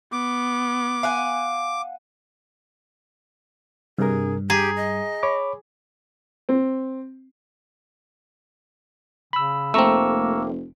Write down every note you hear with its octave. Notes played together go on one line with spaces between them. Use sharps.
B3 D6
F5 F#5 G#5
G2 C3 G#4 A#4
G4 G#4 A#5
D#5
C#5 B5 D6
C4
C#3 B5 E6
F1 A3 A#3 C4 A#5 C#6 E6